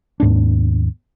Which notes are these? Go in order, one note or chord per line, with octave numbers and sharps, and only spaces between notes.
D#2 G#2 B3 D4